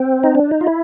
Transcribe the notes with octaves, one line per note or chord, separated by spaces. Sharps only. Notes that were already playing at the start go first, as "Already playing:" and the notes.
Already playing: C4
D#4
D4
D#4
F4
E4